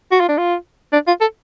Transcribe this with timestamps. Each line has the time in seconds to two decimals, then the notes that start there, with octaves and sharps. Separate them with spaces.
0.11 F#4
0.20 F4
0.28 D4
0.38 F4
0.93 D4
1.07 F4
1.21 A4